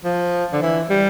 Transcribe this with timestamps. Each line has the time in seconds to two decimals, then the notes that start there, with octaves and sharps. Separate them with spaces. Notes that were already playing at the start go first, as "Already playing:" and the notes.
0.04 F3
0.53 D3
0.62 E3
0.90 G3